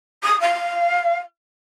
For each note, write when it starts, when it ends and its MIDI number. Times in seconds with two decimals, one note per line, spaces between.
0.23 0.38 87
0.40 1.17 77